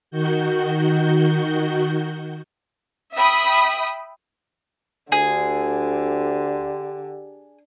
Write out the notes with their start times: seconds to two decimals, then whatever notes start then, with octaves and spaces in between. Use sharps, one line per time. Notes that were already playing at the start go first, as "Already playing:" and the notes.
0.11 D#3 F#4 G6
3.15 E5 G5 B5 D#6
5.12 D2 D3 G4 G#4